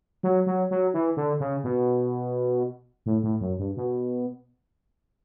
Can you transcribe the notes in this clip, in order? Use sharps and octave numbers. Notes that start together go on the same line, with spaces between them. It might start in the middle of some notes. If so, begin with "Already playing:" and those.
F#3
F#3
F#3
E3
D3
C#3
B2
A2
A2
F#2
G2
B2